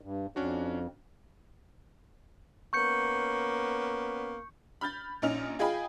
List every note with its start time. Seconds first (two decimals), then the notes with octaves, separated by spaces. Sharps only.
0.01 G2
0.36 F2 C#4 D4 F#4
2.73 A#3 B3 C#4 C#6 G6 C#7
4.81 B5 F6 G6 A6
5.22 A#1 C#4 D#4 F6 F7
5.59 F4 G#4 D#5 G5 B5